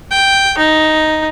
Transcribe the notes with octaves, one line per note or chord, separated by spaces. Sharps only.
G5
D#4